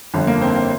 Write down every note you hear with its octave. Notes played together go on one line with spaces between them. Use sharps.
G1 F2 D3
A#3
C4
C4